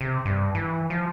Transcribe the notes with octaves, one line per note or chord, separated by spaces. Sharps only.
C3
G2
E3
F3